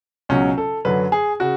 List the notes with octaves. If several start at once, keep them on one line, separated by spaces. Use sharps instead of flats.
C#2 B2 F#3 C#4
A4
F#2 D3 F#3 B4
G#4
C#3 F#4